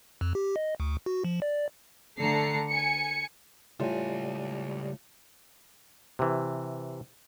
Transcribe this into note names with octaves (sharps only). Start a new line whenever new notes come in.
F2
G4
D#5
D2
F#4
F3
D5
D3 A3 A5 A#5 C7 C#7
G#5 C#7
C#2 A2 G3 F4 G#5
C3 E3